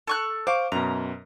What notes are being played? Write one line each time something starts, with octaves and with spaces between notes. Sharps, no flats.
A4 C#6 F#6
C5 F5 C#6 D6
F#2 B2 A#5